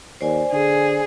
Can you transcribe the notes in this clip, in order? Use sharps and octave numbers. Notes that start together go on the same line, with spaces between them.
D#2 C5 D5 G#5
D3 G#4